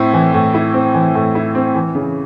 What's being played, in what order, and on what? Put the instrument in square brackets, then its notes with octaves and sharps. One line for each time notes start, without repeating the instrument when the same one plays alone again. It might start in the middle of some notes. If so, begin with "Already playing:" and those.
Already playing: [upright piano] A2 C4 E4
E3
A2
E4
C4
E3
A2
E4
C4
E3
C#3